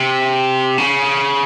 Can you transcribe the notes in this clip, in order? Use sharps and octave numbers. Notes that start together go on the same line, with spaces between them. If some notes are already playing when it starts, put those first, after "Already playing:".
Already playing: C3
C#3